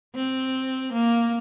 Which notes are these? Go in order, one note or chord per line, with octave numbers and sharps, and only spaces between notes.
C4
A#3